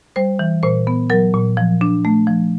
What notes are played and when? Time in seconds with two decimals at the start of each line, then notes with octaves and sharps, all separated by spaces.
0.16 G3 C5
0.39 E3
0.63 A#2 C5
0.87 B3
1.10 F#3 A#4
1.34 A#2
1.57 F3
1.81 D4
2.05 A3
2.27 F3